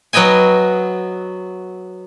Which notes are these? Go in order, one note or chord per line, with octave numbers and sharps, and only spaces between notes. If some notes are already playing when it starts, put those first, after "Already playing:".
F#3 B3 D#5 G5 G#5